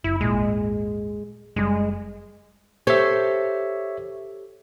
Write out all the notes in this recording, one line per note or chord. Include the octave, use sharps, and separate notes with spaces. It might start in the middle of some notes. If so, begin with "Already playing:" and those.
F#1 E4
D#1 G#1 A#2 G#3
F#1 C3 G3 G#3
G4 A4 C5 C#5 E5